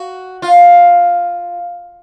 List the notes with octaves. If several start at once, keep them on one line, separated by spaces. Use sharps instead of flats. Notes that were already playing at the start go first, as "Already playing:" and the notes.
Already playing: F#4
F4